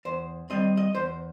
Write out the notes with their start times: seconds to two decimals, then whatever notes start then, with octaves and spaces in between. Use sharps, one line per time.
0.05 E2 C5
0.50 D#3 G3 C4 D#5
0.77 D#5
0.95 E2 C5